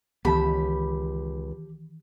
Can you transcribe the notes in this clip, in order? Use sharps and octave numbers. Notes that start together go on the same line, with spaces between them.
C#2 D#3 E3 B3 G4 A5 B5